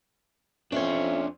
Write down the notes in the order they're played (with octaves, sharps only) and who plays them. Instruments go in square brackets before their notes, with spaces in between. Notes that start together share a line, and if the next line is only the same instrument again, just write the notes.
[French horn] F2 [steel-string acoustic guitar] C#4 C#5 [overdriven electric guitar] D4 C5 [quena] E5